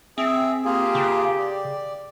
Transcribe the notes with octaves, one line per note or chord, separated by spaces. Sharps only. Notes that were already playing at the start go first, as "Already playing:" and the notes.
C4 G#4 E5
A#3 F4 G4 G#4
C#3
D5